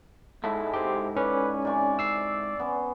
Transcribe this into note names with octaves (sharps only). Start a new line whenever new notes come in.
G#2 G#3 E4 A4
G4 C5
C#4 B4 C#5 D5
C3 D5 G#5 C#6
E6 C7
B3 C#4